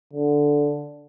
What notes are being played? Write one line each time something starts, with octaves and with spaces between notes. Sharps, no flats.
D3